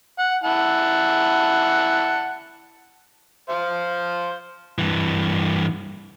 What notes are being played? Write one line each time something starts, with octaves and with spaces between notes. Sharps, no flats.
F#5
E4 F#5 A5
C5 F5
G2 E3